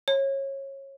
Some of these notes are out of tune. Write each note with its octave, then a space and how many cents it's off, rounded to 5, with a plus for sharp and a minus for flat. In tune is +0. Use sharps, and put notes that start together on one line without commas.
C#5 -25